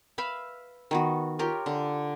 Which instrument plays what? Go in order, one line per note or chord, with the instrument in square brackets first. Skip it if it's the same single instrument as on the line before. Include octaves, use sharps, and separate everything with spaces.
[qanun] B4 E5 F5 B5
D#3 B3 F#4
F4 G4 A#4 C#5
D3